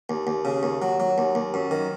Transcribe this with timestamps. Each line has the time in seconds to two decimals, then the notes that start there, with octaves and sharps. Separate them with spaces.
0.10 D#2
0.27 D#2
0.45 C#3
0.63 D#2
0.82 F#3
1.00 F#3
1.18 D#2
1.35 D#2
1.54 F#2
1.71 D#3